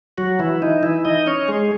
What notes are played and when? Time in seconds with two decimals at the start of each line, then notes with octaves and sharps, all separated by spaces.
0.18 F#3 F#4
0.39 E3 E4
0.62 D#4
0.83 E3 E4
1.05 D#4 D#5
1.27 C#4 C#5
1.48 G#3 G#4